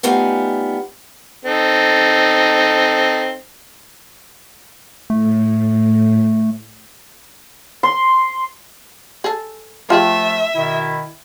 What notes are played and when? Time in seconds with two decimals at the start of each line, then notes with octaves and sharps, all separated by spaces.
0.03 G3 A3 B3 D#4 F4 G#5
1.45 C4 D#4 A4
5.10 A2 A3
7.83 C6
9.24 G#4 A4
9.90 F3 A3 F4 G4 G#4 E5 A5
10.55 B2 D#3 E4